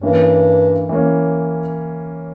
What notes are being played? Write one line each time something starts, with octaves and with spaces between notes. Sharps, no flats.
G2 E3 A#3 C#4
E3 A#3 C#4